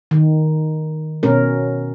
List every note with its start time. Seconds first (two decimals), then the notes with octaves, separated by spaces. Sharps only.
0.11 D#3
1.23 B2 C#4 A#4